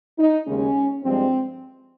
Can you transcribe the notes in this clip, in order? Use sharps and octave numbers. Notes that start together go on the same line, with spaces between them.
D#4
D#2 C#3 G#3 C#4
G2 F3 G#3 C4